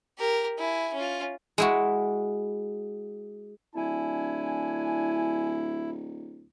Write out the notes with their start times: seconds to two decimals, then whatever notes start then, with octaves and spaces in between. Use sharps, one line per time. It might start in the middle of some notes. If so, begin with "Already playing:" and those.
0.18 G4 A#4
0.58 E4 G#5
0.94 C#4 F4
1.58 G#3 E4 F#4
3.76 D1 D4 E4 G#5